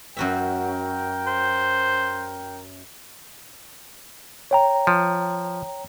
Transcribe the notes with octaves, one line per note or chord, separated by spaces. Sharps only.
F#2 F#4 A#4 E5 G5
C5
C#5 G5 A#5
F3